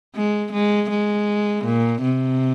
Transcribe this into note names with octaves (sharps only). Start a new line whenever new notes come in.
G#3
G#3
G#3
A#2
C3